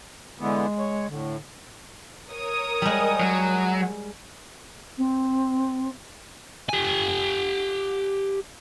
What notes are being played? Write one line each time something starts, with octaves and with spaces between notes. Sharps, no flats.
D3 E3 G#3 B3
C#5
A2 D3
A#4 C#5 D#6
G3 G#3
F#3
C4
G4 G#5